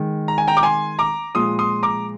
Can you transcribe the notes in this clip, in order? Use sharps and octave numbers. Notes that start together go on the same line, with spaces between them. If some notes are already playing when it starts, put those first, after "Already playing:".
Already playing: D#3 G#3
A#5
G#5
G5 A#5
D6
G#5 C6
A#5 D6
A#2 F3 G#3 C6 D#6
C6 D#6
A#5 D6